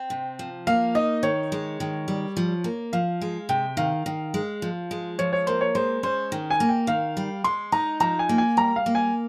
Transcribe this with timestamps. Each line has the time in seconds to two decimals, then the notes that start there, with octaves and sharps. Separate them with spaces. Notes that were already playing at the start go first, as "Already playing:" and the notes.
Already playing: C4
0.10 C3
0.39 F3
0.67 A#3 F5
0.95 D#4 D#5
1.23 D#3 C#5
1.52 G#3
1.80 D#3
2.08 G3
2.37 F3
2.64 A#3
2.93 F3 F5
3.21 G#3
3.49 C3 G5
3.77 D#3 F5
4.06 D#3
4.34 G#3
4.62 F3
4.91 G#3
5.19 F3 C#5
5.33 C#5
5.47 A#3 C5
5.61 C#5
5.75 G#3 C5
6.03 C#4 C5
6.32 D#3
6.50 G#5
6.60 A#3
6.69 G5
6.87 D#3 F5
7.17 G3
7.44 G#3 C6
7.72 D#4 A#5
8.00 F3 A#5
8.19 G#5
8.29 A#3
8.38 G#5
8.57 G3 A#5
8.76 F5
8.86 A#3
8.95 G#5